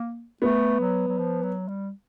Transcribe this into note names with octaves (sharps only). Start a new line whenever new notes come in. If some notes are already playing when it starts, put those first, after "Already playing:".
Already playing: A#3
A3 B3
F#3
F#3
F3
F#3
G3